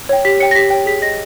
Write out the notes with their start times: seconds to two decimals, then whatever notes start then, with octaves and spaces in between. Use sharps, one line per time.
0.09 C#5 G5
0.25 G4 B6
0.40 C#5 G5 C#7
0.51 A#6
0.55 G4 B6
0.70 C#5 G5
0.86 G#4 B6
1.02 D#5 G5 A#6